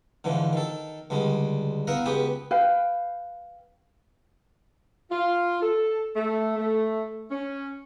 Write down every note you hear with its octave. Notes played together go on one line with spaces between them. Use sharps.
G#2 D3 E3 F3
D#3 A4
C#2 D3 G3 G#3
B3 E4 A#4 F5 F#5
C#2 B3 G4 G#4 B4
B4 F5 G5
F4
A4
A3
A3
C#4